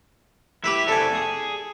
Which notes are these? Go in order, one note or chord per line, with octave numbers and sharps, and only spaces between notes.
E4 G4 B4 E5
C3 A4 D5 G#5
G#4